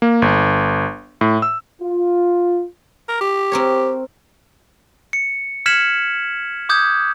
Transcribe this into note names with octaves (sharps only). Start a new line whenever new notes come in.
A#3
G1
A2
E6
F4
A#4
G4
C4 A#4 C#5
C#7
F6 G#6 B6 C#7 E7 F#7
D6 D#6 G6 G#6